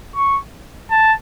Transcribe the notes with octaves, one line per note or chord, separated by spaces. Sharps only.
C#6
A5